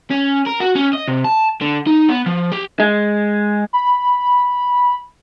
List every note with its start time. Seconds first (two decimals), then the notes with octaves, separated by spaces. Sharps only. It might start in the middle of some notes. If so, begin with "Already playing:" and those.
0.11 C#4
0.46 A#4
0.60 F#4
0.75 C#4
0.93 D#5
1.08 C3
1.24 A5
1.61 D3
1.87 D#4
2.09 B3
2.26 F3
2.52 G4
2.80 G#3
3.73 B5